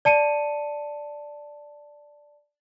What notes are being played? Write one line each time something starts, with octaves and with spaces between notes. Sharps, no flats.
D5 A5 C#7 D#7